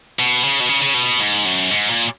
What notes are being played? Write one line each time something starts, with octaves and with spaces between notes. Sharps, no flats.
B2
C#3
B2
C#3
C#3
B2
G#2
F#2
G#2
A#2